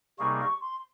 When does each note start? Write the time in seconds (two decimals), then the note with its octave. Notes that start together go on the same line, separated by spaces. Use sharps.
0.19 C3 G3 A#3 D#4 G#4 C#6
0.39 C#6
0.61 C6